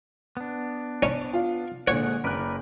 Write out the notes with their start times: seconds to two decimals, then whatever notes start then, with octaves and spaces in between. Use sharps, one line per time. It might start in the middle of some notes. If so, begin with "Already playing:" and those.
0.37 B3 D4
1.02 C#4 D5
1.33 F4
1.88 A#2 D3 G#3 D4 C#5 F#5
2.24 F#1 A#4 B4 D5 F#6